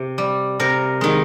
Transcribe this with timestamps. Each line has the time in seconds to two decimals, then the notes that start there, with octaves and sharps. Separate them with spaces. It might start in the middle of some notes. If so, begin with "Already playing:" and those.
Already playing: C3
0.18 G3
0.60 C3 A#4
1.01 D#3 G#3